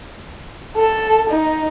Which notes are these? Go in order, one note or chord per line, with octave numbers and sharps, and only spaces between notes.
A4
D#4